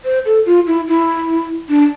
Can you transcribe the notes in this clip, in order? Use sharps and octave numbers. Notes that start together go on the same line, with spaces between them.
C5
A4
F4
E4
E4
D4